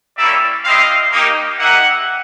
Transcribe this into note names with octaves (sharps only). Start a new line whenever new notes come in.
G3 A#3 C#4 E4 D5 E5
C4 E4 G4 D#5 F5
A#3 D#4 G4
A#3 D#4 G4 E5 F#5